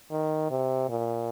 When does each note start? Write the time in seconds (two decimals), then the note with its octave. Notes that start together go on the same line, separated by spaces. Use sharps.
0.11 D#3
0.51 C3
0.89 A#2